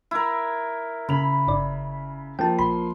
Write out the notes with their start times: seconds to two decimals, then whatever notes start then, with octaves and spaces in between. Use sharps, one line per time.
0.11 E4 A#4
1.09 C#3 B5 F7
1.48 G1 D5
2.39 F3 A#3 G5 A5
2.59 A#1 B5 C6